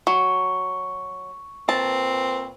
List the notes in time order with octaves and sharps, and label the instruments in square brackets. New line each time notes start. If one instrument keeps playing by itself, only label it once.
[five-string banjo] F#3 [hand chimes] C#6
[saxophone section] A#2 C4 B4 [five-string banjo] A5